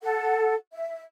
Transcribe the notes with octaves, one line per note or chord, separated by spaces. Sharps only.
A4 F#5
E5